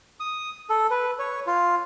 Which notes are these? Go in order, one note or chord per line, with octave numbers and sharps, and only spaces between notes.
D#6
A4
B4
C#5
F4